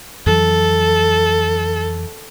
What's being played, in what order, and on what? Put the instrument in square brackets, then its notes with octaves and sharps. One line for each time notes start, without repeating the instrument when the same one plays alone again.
[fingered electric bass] F2 E3 F#3 [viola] A4